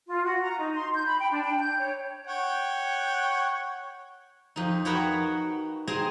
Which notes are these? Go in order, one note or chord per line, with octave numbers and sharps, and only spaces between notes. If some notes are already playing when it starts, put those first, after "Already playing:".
F4
F#4
A#5
D#4
C6
G6
B5
G5
D4
G5
G6
C#5
C#5 F#5 G5
F2 D#4
F#4 A#4 B4 C#5 G5
G#4 C5 D#5 G5 G#5 A#5